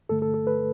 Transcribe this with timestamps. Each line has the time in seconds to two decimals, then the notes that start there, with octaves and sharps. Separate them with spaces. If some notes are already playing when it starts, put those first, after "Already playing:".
0.09 G2 D3 A3 A4
0.22 A4
0.34 A4
0.47 B4